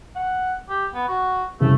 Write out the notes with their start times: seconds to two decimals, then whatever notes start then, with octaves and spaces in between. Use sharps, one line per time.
0.16 F#5
0.69 G4
0.94 B3
1.08 F#4
1.60 C2 F2 C#3 A3